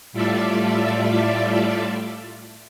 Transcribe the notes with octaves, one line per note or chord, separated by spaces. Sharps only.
A2 G3 F4 A4 D5 E5